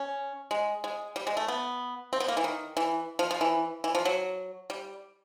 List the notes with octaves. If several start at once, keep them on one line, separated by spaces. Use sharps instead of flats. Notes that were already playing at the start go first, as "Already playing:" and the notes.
Already playing: C#4
G#3
G#3
G3
G#3
A3
B3
C4
B3
A#3
E3
D#3
E3
F3
F3
E3
E3
F3
F#3
G3